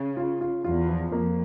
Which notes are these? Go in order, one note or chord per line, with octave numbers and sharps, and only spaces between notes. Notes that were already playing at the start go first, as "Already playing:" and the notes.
Already playing: C#3
F4
F4
E2 F4
F3
F2 A#3